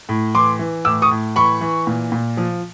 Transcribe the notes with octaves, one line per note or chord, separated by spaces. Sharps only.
A2
E3 C6 D6
E3
A2 D6 E6
C#6 D#6
A2
E3 B5 C#6
E3
A#2
A#2
F3